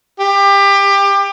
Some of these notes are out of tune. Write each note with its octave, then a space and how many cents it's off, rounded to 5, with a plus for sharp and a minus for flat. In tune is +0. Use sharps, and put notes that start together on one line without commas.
G4 +25